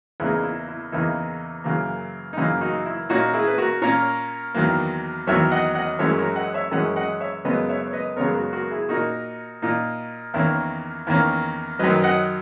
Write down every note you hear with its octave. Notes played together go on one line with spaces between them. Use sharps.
E2 C#3 E3 A#3 D#4 E4 G#4
E4
E4
E2 C#3 E3 A#3 D#4 E4
F#2 C#3 E3 A#3
D#4
F#2 C#3 E3 A#3 E4
D#4 F#4
E4
A#2 A#3 C#4 D#4 F#4
E4 G#4
B4
F#4 A#4
A#2 A#3 C#4 A#4 C#5
E2 D#3 F#3 A#3
E2 D#3 F#3 A#3 C#5 E5
D#5 F#5
D#5 F#5
F#2 E3 G#3 C#4 C#5 E5
F#4 A#4
D#5 F#5
C#5 E5
F#2 E3 G#3 C#4 D#5 F#5
D#5 F#5
C#5 E5
F#2 C#3 G#3 B3 B4 D#5
C#5 E5
C#5
B4 D#5
F#2 C#3 G#3 B3 A#4 C#5
F#4 A#4
F#4 A#4
E4 G#4
A#2 A#3 D#4 F#4 A#4
A#2 A#3 D#4
E2 D#3 A#3 C#4 E4
E2 D#3 A#3 C#4
F#2 D#3 F#3 B4 D#5
D#5 F#5